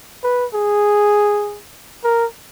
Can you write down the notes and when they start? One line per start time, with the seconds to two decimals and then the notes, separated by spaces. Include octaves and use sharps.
0.24 B4
0.54 G#4
2.04 A#4